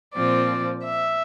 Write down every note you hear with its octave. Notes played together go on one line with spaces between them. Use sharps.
A#2 F3 C4 D5
E5